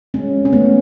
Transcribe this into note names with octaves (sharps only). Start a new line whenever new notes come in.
G#3 C#4
C#4
A3 B3